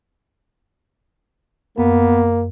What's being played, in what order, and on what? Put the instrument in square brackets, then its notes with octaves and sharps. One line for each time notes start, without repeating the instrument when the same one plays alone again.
[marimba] F#2 [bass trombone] A#3 [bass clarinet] B3